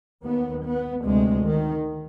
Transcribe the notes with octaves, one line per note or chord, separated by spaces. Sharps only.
D#2 B3
B3
D2 C3 G#3
D#3